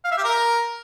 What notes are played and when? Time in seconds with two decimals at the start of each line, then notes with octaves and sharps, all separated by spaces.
0.05 F5
0.11 E5
0.18 G4
0.24 A#4